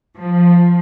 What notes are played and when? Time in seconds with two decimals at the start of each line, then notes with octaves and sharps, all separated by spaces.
0.18 F3